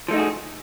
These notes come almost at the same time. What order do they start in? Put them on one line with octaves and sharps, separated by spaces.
F3 A3 D#4 F#4 G#4